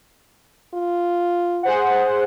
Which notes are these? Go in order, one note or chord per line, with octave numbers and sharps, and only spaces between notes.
F4
G#4 C5 F#5